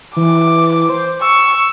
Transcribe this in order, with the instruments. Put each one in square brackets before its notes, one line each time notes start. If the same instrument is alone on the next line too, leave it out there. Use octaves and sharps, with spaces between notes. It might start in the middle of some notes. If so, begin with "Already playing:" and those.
[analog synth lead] E3 [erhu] D6
[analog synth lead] C5
[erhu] C#6 [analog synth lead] E6